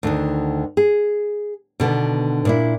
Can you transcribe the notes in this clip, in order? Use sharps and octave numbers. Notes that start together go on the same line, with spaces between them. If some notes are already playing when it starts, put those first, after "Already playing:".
D2 D3 D#3
G#4
B2 D3 D#3 B3
A#2 D4 E4